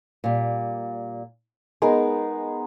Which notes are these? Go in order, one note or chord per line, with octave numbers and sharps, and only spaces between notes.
A#2 G3
G#3 B3 D#4 A#4